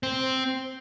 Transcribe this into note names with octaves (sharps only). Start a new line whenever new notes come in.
C4